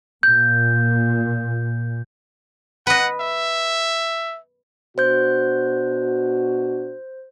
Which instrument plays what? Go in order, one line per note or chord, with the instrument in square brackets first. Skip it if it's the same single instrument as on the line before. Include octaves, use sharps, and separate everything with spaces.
[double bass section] A#2 [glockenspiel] G6
[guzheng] B4 D#5 [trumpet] F#5
[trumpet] E5
[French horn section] B2 D4 F#4 [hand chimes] C5 G6